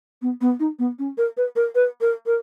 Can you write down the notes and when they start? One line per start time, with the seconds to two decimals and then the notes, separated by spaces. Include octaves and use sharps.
0.22 B3
0.41 B3
0.60 D#4
0.79 B3
0.99 C#4
1.18 A#4
1.37 B4
1.56 A#4
1.75 B4
2.01 A#4
2.26 A#4